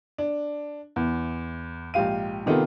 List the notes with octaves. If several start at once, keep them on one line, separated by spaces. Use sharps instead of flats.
D4
E2
A#1 G#2 G4 F5 D#7
C3 D#3 B3 D#4 F4 A4